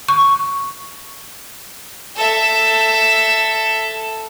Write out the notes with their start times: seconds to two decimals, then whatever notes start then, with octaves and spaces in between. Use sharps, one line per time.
0.08 C#6
2.16 A4 E5